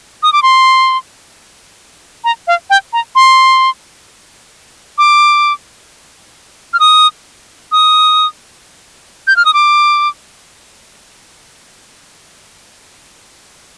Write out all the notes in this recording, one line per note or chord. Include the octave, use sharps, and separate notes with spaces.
D#6
D6
C6
A#5
F5
G5
A#5
C6
D6
F6
D#6
D#6
G6
F6
D#6
D6